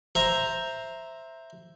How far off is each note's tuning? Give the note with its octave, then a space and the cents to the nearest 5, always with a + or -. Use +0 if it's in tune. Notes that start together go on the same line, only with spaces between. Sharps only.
C5 +5 E5 +0 A#5 +0